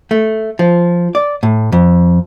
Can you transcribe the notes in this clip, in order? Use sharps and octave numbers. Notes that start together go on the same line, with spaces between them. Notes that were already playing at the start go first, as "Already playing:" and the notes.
A3
F3
D5
A2
F2